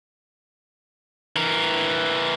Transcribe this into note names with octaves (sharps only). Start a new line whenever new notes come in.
E3 A#4